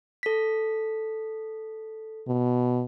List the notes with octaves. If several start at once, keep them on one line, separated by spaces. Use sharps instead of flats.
A4 B6
B2